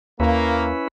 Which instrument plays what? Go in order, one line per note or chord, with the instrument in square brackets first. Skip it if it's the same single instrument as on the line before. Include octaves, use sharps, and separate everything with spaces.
[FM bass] D#2 [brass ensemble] A#3 [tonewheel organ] C#4 E4 B4